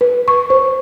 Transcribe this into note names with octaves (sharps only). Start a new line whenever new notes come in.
B4
C#6
C5